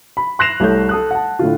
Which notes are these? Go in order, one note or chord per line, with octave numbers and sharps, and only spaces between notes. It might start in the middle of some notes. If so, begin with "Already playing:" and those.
B5
C6 F#6 A#6 C7 E7 F7
C2 A3 C#5 G6
A4 D#6 F#6
F#5 A5
A2 D3 F4